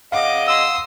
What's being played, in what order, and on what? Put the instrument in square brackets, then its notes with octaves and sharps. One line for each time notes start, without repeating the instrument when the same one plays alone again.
[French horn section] C#3 D#5 [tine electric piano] F5 F#5 [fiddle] D6
[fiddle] C6 D#6 [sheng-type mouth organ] E6